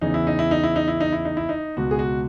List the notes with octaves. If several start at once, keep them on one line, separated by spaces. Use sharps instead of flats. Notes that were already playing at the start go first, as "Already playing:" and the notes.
E2 C#3 E3 D#4
E4
D#4
E4
D#4
E4
D#4
E4
D#4
E4
D#4
E4
D#4
C#2 B2 F#4
G#4
F#4